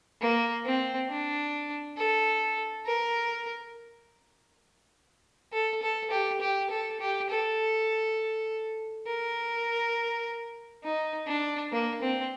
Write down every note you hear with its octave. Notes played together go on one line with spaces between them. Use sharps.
A#3
C4
D4
A4
A#4
A4
A4
G4
G4
A4
G4
A4
A#4
D#4
D4
A#3
C4